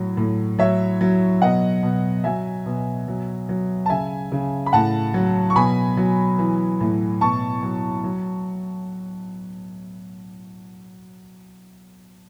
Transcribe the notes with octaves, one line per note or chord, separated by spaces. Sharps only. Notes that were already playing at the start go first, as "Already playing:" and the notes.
Already playing: A2 F#3
A2
F#3 C#5 E5
F#3
B2 D#5 F#5
B2
F#3 E5 G#5
B2
F#3
F#3
A5
C#3 E5 G#5
C#3
B5
A2 F#5 A5
F#3
C#6
B2 G#5 B5
F#3
E3
A2
B2 A5 C#6
F#3
F#3